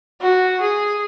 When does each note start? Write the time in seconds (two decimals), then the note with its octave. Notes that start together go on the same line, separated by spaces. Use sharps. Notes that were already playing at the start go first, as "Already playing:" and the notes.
0.21 F#4
0.60 G#4